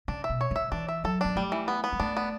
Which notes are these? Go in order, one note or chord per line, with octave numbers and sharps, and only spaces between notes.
C#3 D4
E5
B2
C#5
D3 E5
E3 D4
E5
F#3 A4
B3 D4
G3 A3
E3
B3
B3
G3
A3 D4
B3